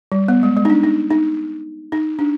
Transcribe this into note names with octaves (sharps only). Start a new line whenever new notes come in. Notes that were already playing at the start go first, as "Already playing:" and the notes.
G3
B3
G#3
G#3
D#4
D4
D#4
D#4
D#4
D4